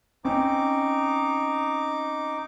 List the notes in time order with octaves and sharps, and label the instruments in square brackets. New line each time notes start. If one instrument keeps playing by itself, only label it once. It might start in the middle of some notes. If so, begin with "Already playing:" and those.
[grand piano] C4 C#4 [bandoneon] D#4 D6